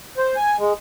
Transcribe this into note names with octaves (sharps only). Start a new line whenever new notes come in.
C5
G#5
G#3